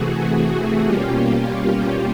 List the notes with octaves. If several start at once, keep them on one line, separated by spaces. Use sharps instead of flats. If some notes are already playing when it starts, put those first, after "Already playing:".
Already playing: C3 E3 A3 F#4 G#4
B2 G3 A#3 C#4 F4 G4